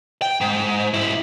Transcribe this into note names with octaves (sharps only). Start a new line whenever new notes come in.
G5
G#2
G#2 E4